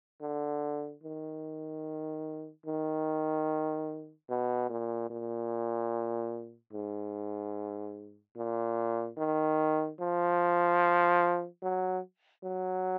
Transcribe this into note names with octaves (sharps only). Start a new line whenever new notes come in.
D3
D#3
D#3
B2
A#2
A#2
G#2
A#2
D#3
F3
F#3
F#3